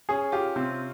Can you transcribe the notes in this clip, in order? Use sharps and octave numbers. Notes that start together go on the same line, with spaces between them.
C#4 G#4
F4 G4
C3 C4